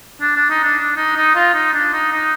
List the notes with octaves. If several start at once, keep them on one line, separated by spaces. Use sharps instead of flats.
D4
D4
D#4
D4
D4
D#4
D#4
F4
D#4
D4
D#4
D#4